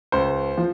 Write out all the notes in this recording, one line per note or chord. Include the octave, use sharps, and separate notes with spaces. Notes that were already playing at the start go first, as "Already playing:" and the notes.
C#2 C5
F3